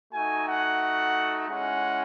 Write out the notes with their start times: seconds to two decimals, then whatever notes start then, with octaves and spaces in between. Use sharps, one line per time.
0.13 A3 D#4 F#4 G#5
0.47 F#5
1.47 G#3 C#4 E4 F#5